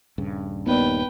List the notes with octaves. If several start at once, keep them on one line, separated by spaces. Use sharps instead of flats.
D#1 G2 C#3
D#2 B3 B4 D5 G5